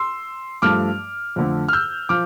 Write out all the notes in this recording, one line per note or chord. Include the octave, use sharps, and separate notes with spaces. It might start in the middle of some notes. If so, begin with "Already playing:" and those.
Already playing: C6 E6
G2 F3 A3 D6 F6
F2 D3 A3
F6
E6 G6
F3 D6 F6